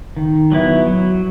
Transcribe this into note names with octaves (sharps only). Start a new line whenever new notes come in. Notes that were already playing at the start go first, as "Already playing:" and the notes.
D#3
F#3 B3 E4
F#3